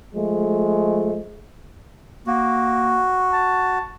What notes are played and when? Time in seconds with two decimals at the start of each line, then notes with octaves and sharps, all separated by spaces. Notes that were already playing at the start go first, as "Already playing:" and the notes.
0.13 F3 G#3 A3
2.27 A#3 F#4
3.32 A5